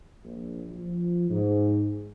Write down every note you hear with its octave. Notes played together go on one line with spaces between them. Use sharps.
A#1
F3
G#2